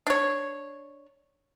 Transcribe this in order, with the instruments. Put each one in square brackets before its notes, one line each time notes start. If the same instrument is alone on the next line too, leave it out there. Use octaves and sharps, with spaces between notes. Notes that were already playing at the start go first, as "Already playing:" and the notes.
[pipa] D4 C#5